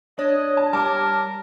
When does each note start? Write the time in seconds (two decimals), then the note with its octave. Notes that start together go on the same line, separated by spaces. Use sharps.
0.19 D4 C#5 D#5
0.57 A5
0.73 G3 A#4 A5 D6